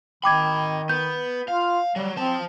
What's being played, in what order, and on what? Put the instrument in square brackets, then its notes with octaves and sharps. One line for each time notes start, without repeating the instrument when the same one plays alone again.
[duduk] D#3 [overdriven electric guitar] D#5 B5 [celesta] G5 D6 G#6
[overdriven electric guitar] B3 [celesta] G6
[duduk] F4 [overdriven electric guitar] F5
[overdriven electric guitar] F#3 [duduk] G3
[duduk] C4 [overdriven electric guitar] C5 A5